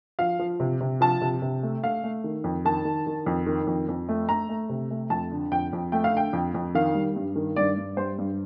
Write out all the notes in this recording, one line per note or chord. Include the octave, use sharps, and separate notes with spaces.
F3 F5
F3
C3
C3
F3 A5
C3
C3
A3
A3 F5
A3
D#3
F2
D#3 A5
D#3
D#3
F2
D#3
F2
F2
A3
A3 A#5
A3
C3
A3
F2 A5
D3
F2 G5
F2
A3 G5
F5
D3 G5
F2
F2
D#3 F5
G3
G2
D#3
G2 D5
G2
G3 C5
G2